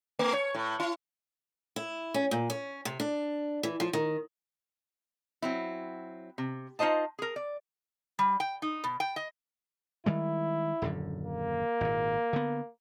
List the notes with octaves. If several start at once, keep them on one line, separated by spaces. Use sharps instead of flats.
A3
C#5
A2
E4
E4
C#4
A#2
C#4
C3
D4
E3
F3
D#3
F#3 C4 E4
C3
D#4 F4 C5 D#5 A5
G#4 A#4
D5
G3
G5
D#4
B2
G5
D#5
D#3 G3 G#3 E4
D#1 F#2 D3
A#3
G#1 A#2
D3 B3